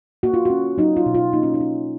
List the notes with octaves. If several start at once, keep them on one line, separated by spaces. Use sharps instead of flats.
A#3 F#4
F4
C#4 F#4
F#3 D#4
F4
B2
F4
A#3 D#4
C#4
D#4
C#4